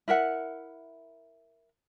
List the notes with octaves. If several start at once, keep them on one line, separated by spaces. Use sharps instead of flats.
E4 A#4 E5 F#5